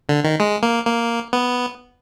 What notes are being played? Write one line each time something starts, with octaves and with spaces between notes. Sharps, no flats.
D3
D#3
G#3
A#3
A#3
B3